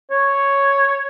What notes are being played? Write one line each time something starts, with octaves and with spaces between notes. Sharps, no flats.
C#5